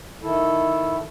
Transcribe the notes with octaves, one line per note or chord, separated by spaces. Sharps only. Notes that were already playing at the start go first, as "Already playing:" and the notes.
D#3 E4 A4